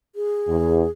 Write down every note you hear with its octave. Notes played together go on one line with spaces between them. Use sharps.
G#4
E2